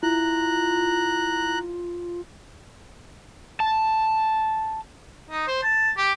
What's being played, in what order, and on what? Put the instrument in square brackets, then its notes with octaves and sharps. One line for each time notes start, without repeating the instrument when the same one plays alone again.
[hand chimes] E4 [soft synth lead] F4 [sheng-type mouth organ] A#5 F#6
[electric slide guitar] A5
[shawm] D#4
C5
A5
G4